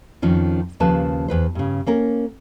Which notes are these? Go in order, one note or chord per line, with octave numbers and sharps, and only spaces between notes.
F2 D#3 F3 C#4
D#2 C#3 F3 B4 A5
E2 B4 C5
G2 C#3
A#3 C#4 A#4